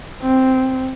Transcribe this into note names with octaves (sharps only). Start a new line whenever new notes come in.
C4